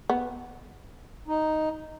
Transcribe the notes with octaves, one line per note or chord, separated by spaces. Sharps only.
B3
D#4